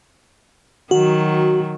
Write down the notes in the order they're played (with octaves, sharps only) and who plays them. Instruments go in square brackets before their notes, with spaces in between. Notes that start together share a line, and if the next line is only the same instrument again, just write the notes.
[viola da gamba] D#3 F#3 [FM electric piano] F#4